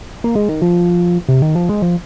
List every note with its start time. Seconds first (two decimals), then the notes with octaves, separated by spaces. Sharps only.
0.24 A#3
0.35 G#3
0.49 D#3
0.62 F3
1.29 C3
1.42 D#3
1.55 F3
1.69 G#3
1.82 F3